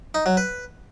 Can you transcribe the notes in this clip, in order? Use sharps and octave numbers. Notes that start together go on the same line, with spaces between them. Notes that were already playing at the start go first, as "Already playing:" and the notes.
D#4
F#3
B4